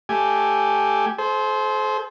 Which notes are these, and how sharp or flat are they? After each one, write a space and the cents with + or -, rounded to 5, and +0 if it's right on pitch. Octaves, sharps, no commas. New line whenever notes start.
A3 +0 G4 +0 G#5 +0
A4 -45 C5 +0